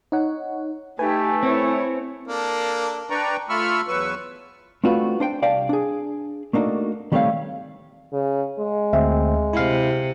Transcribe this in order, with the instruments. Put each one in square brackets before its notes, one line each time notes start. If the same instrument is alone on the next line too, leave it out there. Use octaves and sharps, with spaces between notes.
[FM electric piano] D#4 C#5 F#5
[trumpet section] A3 [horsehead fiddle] D#4 G4 [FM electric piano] B4 G#5
[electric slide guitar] C4 [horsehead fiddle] E4 C#5
[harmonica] A#3 D4 A4
[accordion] D4 B4 D5 G5 A#5 C#6
A3 F4 B5 C#6 E6 F6
E2 F#3 B4 C#6 E6
[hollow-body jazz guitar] A3 C4 D4 F4 F#4 B4
D4 C5 G5
C2 D5 F5 G5 A5
D4 G#4
A3 A#3 D4 D#4 F#4
D#3 G3 A3 C4 C#5 F5
[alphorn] C#3
G#3
[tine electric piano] D2 C4 [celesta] E5
[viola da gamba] C3 [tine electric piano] E4 F5